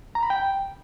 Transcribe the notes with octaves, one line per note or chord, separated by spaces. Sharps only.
A#5
B5
G5